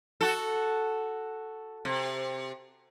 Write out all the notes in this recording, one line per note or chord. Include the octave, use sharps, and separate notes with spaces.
F#4 A4
C3